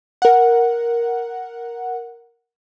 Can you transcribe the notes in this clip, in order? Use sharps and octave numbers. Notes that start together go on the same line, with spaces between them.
A#4 F#5